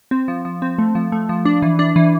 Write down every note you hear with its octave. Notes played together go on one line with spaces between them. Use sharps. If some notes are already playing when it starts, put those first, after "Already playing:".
C4
F3
F3
C4
A3
F3
A3
F3
D4
E3
D4
E3